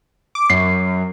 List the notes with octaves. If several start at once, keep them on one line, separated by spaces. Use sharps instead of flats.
D6
F#2 C7